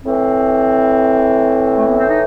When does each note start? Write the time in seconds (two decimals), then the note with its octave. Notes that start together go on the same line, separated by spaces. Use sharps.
0.05 A2 E3 C4
1.77 A3
1.87 B3
1.99 C4
2.09 D#4